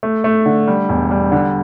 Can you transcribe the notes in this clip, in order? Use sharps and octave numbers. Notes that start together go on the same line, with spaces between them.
A3
A3
D3
G3
E1
G3
D3